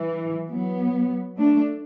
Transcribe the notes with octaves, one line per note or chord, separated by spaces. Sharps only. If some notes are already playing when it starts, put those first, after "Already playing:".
Already playing: E3
F#3 B3
A3 D4